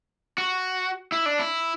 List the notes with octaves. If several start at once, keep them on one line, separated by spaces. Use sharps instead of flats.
F#4
E4
D4
E4